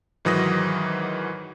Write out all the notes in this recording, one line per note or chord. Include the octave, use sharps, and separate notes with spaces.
G#2 D#3 E3 F#3 D#6 A#6